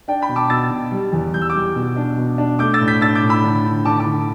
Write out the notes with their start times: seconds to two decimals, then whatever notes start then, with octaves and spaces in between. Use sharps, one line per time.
0.08 D4 D5 G5
0.22 G5 B5
0.29 B2
0.36 A5 D6
0.50 B2 E6 A6
0.71 B2
0.92 G3
1.13 E2
1.34 G3 G6
1.42 E6
1.50 D6 G6
1.55 G3
1.76 B2
1.96 D4
2.18 B2
2.38 D4
2.59 A3 D6 G6
2.73 E6 A6
2.81 A2
2.88 G6 B6
3.01 D4 E6 A6
3.15 D6 G6
3.23 A2
3.29 B5 E6
3.43 D3
3.64 D3
3.85 D3 A5 D6
3.99 A5 D6
4.07 D3